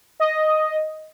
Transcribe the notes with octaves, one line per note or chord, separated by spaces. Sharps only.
D#5